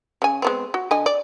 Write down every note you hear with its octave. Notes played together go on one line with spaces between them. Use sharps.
C#3 G#5
G#3 B3 C4
F#4
D3 D#5 G#5
D5